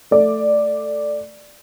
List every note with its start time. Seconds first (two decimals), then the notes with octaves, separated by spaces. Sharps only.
0.11 A3 D5